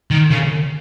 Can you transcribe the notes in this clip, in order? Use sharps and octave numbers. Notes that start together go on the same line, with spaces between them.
D#3
C#3